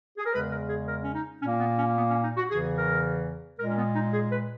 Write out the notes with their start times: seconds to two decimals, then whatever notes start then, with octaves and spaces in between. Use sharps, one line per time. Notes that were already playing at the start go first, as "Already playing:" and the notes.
0.18 G#4
0.26 A#4
0.34 E2 C#3 G#3 B4
0.52 A#4
0.69 G#4
0.88 A#4
1.04 C#4
1.15 D#4
1.42 A#2 A#3 C#4
1.60 B3
1.78 C#4
1.96 B3
2.10 C#4
2.23 D#4
2.37 F#4
2.51 E2 C#3 E3 G#4
2.78 A#4
3.59 A#2 G#3 A#4
3.70 C#4
3.78 B3
3.95 D#4
4.13 G#4
4.32 B4